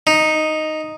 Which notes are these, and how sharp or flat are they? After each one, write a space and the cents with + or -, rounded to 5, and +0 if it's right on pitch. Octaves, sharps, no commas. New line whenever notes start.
D#4 -5